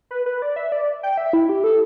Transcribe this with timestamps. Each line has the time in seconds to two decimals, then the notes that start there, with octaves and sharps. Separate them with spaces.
0.11 B4
0.26 B4
0.42 D5
0.56 E5
0.72 D5
1.03 G5
1.18 E5
1.33 E4
1.49 G4
1.64 A4